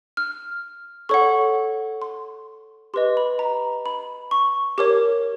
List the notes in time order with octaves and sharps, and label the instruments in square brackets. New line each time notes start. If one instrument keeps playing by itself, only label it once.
[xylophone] F6
A4 C#5 F#5 C#6
C6
G4 B4 D#5 C6
B5
A#5
B5
C#6
G4 A#4 C#5 D6